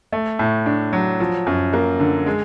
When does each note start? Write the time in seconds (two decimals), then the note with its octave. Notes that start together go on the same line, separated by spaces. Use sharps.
0.12 A3
0.39 A2
0.66 D4
0.93 F#3
1.20 F3
1.47 F#2
1.73 A#3
2.00 D3
2.26 G#3